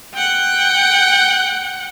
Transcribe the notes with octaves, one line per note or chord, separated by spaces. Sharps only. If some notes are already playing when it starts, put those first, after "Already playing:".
F#5 G5